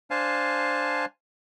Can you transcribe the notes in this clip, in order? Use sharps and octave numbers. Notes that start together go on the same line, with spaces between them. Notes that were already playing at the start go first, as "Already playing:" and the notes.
D4 C5 F5 G#5 A5